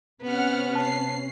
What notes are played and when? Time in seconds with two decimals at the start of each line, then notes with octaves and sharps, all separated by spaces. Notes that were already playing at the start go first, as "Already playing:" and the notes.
0.22 C3 B3 C#4 F#5 F6
0.75 A5 C7